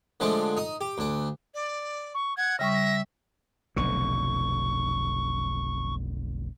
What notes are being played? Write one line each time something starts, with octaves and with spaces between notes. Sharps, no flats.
D3 F3 G#3 A3 D4
D#4 D#6
G4
D2 D4
D5
C#6
F#5 G#6
C#3 G3 E5 C#6 A#6
A#6
F1 B1 D3 C#6